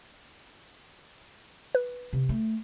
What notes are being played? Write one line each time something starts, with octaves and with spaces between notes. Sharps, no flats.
B4
C3
A3